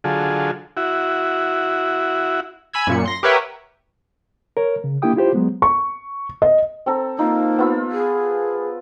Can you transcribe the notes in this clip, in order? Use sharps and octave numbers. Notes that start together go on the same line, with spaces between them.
D3 F#3 F4 G#4 A4
E4 F#4
G#5 B5 E6 G#6
F#2 A#2 C#7
C6 A#6
G4 A#4 B4 C#5 E5 F#5
A#4 C#5
C#3
A#3 D4 E4 G4 G5 D#6
E4 F4 G4 C5
F#3 G#3 B3
C#6
D#5
C4 A4 A#5
A#3 D#4 F4
B3 F4 E6
G#4